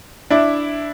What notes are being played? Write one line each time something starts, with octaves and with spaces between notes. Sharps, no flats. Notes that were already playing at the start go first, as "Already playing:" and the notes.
D4 E4